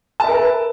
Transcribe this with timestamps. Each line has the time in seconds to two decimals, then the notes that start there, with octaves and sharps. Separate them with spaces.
0.20 A5
0.24 E5
0.28 A#4
0.32 B4